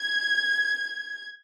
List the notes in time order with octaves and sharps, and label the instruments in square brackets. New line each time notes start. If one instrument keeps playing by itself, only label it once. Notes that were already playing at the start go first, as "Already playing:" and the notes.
Already playing: [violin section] G#6